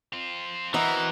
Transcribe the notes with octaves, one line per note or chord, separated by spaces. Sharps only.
C4 F4
E3 B3 C4 F#4 A#4 D#5 A#5